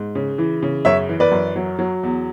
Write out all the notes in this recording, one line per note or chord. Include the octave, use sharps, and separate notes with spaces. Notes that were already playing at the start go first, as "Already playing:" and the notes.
Already playing: G#2
C#3
E3
C#3
F#2 C#5 E5
E3
B4 D5
F#2
F#3
F#3
E2